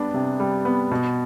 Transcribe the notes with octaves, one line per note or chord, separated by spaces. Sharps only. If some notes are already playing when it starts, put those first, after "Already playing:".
Already playing: G3 B3 D4
C3
G3
B3
B2